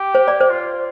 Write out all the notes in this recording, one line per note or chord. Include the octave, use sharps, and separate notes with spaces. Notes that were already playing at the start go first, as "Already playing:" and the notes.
Already playing: G4
C5
D5
C5
F4